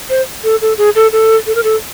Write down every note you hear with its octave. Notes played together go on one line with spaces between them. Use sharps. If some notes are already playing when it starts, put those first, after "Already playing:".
C5
A4
A4
G#4
A4
A4
A4
A#4
A4